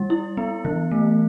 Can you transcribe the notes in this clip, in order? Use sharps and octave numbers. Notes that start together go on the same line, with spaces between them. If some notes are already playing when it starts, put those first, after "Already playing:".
Already playing: G3
E4
B3
E3
A3